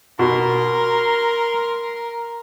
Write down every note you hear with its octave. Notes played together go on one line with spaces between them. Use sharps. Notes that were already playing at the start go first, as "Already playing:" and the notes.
B2 A#4 C6